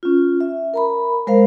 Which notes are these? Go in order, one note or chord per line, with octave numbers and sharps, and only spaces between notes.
C#4 F4
E5
A#4 A#5 B5
G#3 A#4 C5 F5